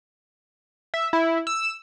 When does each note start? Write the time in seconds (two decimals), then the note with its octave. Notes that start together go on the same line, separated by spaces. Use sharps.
0.94 E5
1.13 E4
1.47 E6